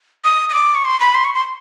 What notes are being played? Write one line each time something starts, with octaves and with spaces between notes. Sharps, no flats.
D#6
D#6
D6
C#6
C6
B5
C6
C#6
C6